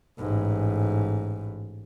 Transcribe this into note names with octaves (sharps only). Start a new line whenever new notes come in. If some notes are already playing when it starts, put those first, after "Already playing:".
A1 G#2